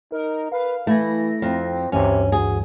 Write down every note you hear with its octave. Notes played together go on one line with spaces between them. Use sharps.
D#4 A#4
B4 F5
E3 A3 E4 A#6
F2 C4
D2 G2 C3 E3 C#4
F#4 G#4